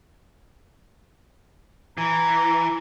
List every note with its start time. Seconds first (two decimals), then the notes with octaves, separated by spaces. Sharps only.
1.98 E3 A#5